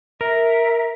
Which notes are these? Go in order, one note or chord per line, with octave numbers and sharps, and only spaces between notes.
A#4 E5